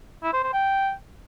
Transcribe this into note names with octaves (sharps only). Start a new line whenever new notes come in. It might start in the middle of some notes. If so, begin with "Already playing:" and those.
E4
C5
C5
G5